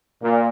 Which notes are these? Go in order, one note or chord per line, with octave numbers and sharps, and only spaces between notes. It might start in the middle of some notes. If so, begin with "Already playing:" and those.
A#2